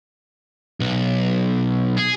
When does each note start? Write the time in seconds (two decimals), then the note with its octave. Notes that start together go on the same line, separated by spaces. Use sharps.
0.80 B1
1.97 G#4